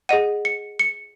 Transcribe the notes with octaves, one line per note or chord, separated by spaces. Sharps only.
G#4 D#5 F#5 D#7
C#7
C#7